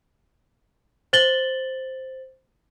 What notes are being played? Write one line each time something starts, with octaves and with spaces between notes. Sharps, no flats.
C5 A6 F#7 G7